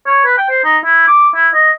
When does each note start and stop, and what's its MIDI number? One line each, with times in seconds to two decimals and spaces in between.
0.07 0.25 73
0.25 0.37 71
0.38 0.48 79
0.50 0.63 72
0.65 0.78 63
0.85 1.06 64
1.08 1.29 86
1.35 1.49 64
1.54 1.71 75